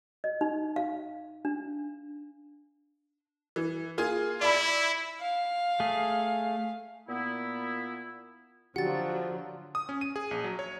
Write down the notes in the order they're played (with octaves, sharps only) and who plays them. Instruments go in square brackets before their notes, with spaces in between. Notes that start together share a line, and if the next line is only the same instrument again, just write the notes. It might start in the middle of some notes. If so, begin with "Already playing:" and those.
[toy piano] D#5
D#4
F5
D4
[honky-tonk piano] E3
A#3 F4 G#4
[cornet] E4 [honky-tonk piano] D5 B5
[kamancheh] F5
[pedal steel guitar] A3 G#4
[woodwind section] A#2 B3 E4
[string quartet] D3 F#3 [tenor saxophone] F3 [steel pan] F#4 G4 [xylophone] F#5 A6
[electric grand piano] D#6
C#4
D#7
G#4
A#1
F#3
C#5